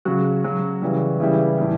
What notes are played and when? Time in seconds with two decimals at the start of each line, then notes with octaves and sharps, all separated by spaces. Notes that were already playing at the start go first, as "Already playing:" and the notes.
0.05 C#3 F#3 F#4
0.44 C#3 F#3
0.82 C#3 E3 G3
1.20 C#3 E3 G3 E4
1.58 A2 E3 G3